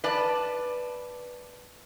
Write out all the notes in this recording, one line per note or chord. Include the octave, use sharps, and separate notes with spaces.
B4 D5 A5